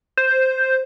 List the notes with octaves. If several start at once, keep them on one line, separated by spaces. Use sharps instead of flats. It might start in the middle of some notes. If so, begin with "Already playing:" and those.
C5